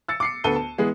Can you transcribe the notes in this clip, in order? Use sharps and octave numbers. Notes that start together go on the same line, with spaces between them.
E6 A6 C#7
D6 C7 C#7
D2 B3 A4 D#7 G7
A5
E3 G#3 B3 G#4